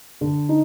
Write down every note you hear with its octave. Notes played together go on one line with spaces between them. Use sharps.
D3
D#4